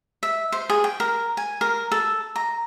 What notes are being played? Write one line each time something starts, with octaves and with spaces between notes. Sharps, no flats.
E5
C5
G#4
G5
A#4
G#5
A#4
A4
A#5